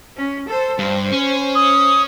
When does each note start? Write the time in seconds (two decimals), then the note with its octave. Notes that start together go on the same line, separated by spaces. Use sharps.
0.17 C#4
0.48 A4 C5
0.78 G2 C5
1.11 C#4
1.55 D#6